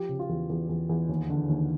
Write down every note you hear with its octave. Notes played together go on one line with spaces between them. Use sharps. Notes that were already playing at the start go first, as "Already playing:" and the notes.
Already playing: F3 G4
C#3
F4
E2
E2
E2
E2
D#2
D3
D#2